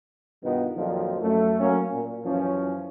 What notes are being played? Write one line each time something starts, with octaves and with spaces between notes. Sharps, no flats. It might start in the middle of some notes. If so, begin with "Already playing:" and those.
G2 B2 D#3 B3 F4
F2 A#2 D#3 F3 F#3
F#2 A3
F#3 A#3 C#4
A#2
F#2 E3 F3 C#4